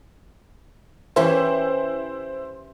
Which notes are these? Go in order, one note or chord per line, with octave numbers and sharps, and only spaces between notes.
E3 C#4 E4 G4 C5